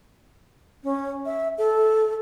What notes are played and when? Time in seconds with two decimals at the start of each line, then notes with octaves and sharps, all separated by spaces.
0.84 C#4
1.26 E5
1.58 A4